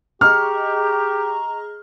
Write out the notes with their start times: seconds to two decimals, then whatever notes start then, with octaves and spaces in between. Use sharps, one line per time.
0.21 G4 G#4 D#5 A#5 C#6 F6